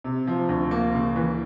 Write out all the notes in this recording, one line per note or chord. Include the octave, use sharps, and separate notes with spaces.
C3
F3
D2
A#3
C#3
E3